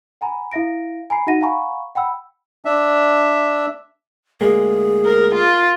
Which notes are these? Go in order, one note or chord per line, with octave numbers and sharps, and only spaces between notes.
F#5 G#5 A#5 B5
E4 E5 F5 A#6 D7
G#5 A#5 B5 C7
D#4 F#4 E5 F#5 A#6 D#7
F5 F#5 G#5 A#5 B5 C#6
F#5 G5 B5 E6
D4 E5
D2 G#3 A#3 G#4
A#4
F4